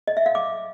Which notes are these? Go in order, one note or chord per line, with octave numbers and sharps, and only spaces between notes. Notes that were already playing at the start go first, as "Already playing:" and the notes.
D#5
E5
F5
D6